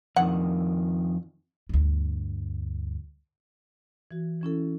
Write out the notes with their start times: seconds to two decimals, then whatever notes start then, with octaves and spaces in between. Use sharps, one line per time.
0.16 F2 D#3 F#5
1.69 D2 G2
4.11 E3 F#4
4.42 E3 C#4 E4 A4